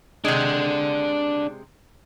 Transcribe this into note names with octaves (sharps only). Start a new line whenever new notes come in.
C3 G#3 D4 F#5